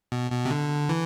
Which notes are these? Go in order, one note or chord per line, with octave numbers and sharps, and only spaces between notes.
B2
B2
C3
D3
E3